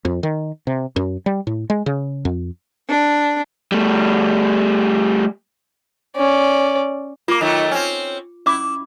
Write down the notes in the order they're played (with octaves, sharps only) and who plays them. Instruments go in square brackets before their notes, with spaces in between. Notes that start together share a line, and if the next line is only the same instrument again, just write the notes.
[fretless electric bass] F2
D#3
C3
F#2
G3
A2
G#3
C#3
F2
[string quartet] D4
[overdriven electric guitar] G3 A3
[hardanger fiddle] C#4 D5
[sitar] A#3 [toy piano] F4 D6
[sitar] D#3 F#3 A3
C4 C#4
[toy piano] C#4 D6 [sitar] E4